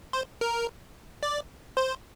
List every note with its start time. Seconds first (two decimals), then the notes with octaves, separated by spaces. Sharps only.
0.13 C5
0.41 A#4
1.23 D5
1.77 C5